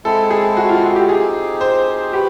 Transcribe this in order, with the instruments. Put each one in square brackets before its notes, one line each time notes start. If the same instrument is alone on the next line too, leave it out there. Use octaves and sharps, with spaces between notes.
[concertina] G#3 C4 E4 [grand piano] A4
[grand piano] G#4
F#4
F4
F#4
G4
[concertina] C4 D#4 G4 [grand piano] G#4
[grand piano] C5
[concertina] F#4 B4 [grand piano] G4